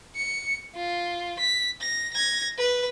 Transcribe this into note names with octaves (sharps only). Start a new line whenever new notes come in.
C#7
F4
B6
A#6
G#6 A#6
B4